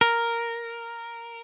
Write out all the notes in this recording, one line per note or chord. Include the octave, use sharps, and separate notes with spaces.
A#4